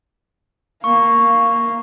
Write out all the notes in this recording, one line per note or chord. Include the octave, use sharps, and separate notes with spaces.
A#3 F5 C#6